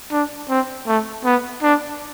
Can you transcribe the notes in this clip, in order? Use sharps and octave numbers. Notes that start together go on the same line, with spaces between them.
D4
C4
A3
B3
D4